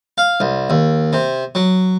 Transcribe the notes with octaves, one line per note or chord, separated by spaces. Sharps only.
F5
C2
D#2
C3
F#3